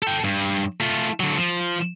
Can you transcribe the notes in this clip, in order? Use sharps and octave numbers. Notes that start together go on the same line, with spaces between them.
A4 G5
G2
A3 F4
D3 F#3
F3